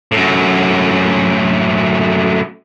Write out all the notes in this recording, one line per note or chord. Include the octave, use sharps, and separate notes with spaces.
F#2 A2